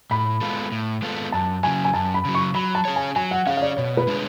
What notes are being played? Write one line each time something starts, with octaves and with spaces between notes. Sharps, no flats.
A2 B5
G#3 B3 F4 A4
A2
G#3 B3 F4 A4
F#2 A5
C#3 F#3 G#5
G#5
F#2 A5
B5
C#3 F#3
C#6
F#3 B5
A5
C#4 G#4 C#5
G#5
F#3 G#5
F#5
C#4 G#4 C#5 F5
F5
D5
B2 C#5
B4
G#3 D4 G#4 C#5